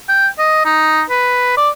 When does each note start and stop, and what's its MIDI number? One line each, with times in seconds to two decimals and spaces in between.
0.09 0.27 79
0.39 0.62 75
0.65 1.02 63
1.10 1.53 71
1.57 1.69 74